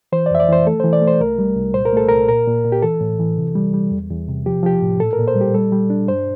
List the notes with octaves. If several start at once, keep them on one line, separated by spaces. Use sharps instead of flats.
E3 C5
D5
F2 E5
D5
E3 C5
A3 A4
E3 C5
D5
A3
C5
C2 A#4
G3
C2
A#2 C5
A#4
A3 A4
C2 A#4
A#2 A#4
A#2
A#2
G4
E3 A4
A2
E3
C3
G3
G3
E2
E2
C3
F3 G4
F3 G4
A2
A#2 A4
A#4
A#2
C5
G3
G4
G3 A4
G3
D4
G2 C5